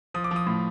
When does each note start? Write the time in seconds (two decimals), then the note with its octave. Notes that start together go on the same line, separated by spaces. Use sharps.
0.14 F3 D#6
0.24 D6
0.31 F3 D#6
0.47 A2